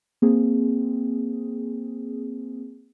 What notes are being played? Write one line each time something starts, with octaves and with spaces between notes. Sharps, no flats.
A#3 C4 G#4